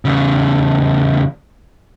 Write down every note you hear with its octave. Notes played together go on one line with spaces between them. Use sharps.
E2 C#3